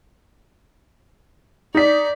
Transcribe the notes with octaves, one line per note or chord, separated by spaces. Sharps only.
D#4 D5 B6